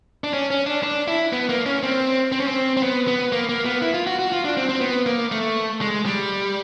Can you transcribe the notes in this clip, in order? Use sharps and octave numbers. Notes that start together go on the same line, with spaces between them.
D4
C#4
C#4
D4
D4
E4
B3
A#3
C#4
C4
C4
C#4
C4
C4
B3
B3
A#3
A#3
B3
E4
F4
F#4
F#4
F4
D4
C4
C4
B3
A#3
A3
G#3
G3